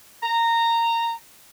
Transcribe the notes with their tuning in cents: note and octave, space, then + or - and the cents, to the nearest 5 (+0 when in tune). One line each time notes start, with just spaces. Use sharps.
A#5 -15